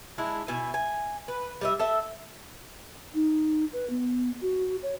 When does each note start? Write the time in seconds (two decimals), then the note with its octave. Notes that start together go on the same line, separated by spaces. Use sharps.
0.18 G#3 D4 E4
0.48 B2 E4 G#5
0.74 G#5
1.28 B4
1.61 G3 D#5 E5
1.79 A4 D#5 E5
3.14 D#4
3.73 B4
3.90 B3
4.42 F#4
4.83 C#5